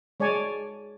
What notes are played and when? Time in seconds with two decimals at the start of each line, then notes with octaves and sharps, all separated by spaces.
0.20 G#3 C#5 D5 G#5 A5